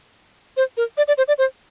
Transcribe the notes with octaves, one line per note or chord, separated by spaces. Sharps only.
C5
A#4
D5
D5
C5
D5
C5